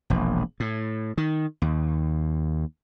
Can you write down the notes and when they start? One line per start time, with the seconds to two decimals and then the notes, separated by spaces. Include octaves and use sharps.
0.10 E1 A#1
0.60 A2
1.18 D#3
1.62 D#2